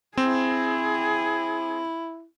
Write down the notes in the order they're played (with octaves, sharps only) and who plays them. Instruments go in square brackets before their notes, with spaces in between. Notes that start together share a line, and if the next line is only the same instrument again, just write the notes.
[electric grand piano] C4 [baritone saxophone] E4 [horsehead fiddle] G#4